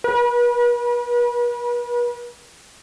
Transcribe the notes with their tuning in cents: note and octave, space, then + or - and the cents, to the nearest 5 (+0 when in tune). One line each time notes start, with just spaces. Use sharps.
B4 -45